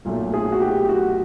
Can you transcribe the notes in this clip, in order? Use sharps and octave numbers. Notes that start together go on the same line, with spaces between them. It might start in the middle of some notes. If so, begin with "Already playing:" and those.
B1 A#2 F#3 A3
G#4
F#4
G4
F#4